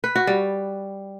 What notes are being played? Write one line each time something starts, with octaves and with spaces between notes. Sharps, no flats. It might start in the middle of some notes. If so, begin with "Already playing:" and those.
B4
F#4
G3